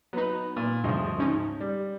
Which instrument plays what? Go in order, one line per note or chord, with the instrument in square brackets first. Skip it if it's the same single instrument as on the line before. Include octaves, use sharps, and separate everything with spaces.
[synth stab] F#3 D#4 [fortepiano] B3 B4
[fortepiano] A#2
[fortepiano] D2 F3 D#5 [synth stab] G2 C#3
[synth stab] G#2 C#4 D#4
[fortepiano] G3